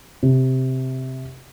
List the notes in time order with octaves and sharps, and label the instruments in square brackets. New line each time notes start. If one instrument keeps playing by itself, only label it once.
[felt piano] C3